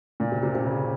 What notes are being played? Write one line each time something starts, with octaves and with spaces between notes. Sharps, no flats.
A#2
C3
C3
C3
C#3